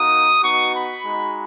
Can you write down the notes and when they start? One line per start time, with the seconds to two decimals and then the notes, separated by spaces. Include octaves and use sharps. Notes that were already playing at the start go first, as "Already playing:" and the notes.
Already playing: A#3 D#4 F#4 D#6
0.42 B3 D#4 F#4 C#6
0.73 B5
1.04 G#3 D#4 F#4